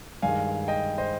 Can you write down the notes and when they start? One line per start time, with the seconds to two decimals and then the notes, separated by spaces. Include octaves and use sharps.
0.22 G2 D#3 G#3 F5 G#5
0.68 D#5 G5
0.98 C5 D#5